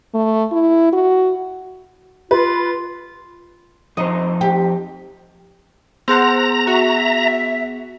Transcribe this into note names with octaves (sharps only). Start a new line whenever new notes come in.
A3
E4
F#4
F4 B4
F2 D#4 C5 D#5
G4
B3 G#4 C5 F#5 A#5
F#4 E5